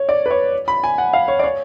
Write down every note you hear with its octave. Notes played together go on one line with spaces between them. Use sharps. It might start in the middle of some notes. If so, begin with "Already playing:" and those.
Already playing: C#5
D5
B4
C#5
B5
G#5
F#5
F5
C#5
D5
C#5